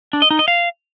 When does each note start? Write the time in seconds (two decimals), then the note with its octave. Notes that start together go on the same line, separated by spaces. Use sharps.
0.13 D4
0.22 D#5
0.30 D#4
0.39 D#5
0.48 F5